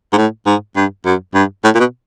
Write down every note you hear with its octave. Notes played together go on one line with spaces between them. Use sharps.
G#2
A2
G#2
G2
F#2
G2
A2
A#2
B2